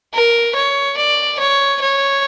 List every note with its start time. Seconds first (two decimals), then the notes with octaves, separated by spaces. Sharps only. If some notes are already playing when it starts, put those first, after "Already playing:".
0.14 A#4
0.55 C#5
0.97 D5
1.39 C#5
1.81 C#5